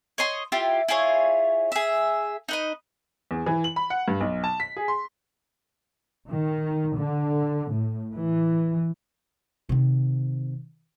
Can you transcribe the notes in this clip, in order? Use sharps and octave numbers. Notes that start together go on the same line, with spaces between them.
C#5 D#5 C6 C#6
E4 F4 G4
E4 F4 G#4 C#5
G#4 E5
D#4 B4 D#5
E2
E3
F#7
B5
F#5
G2
B1
A5
B6
G#4
C6
D#3
D3
A2
E3
C3 D#3